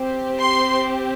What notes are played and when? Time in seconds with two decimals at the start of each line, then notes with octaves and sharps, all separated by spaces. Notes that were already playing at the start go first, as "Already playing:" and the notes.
Already playing: C4 G4
0.40 C6